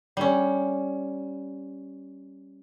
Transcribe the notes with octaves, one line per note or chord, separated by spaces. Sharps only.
G3 C#4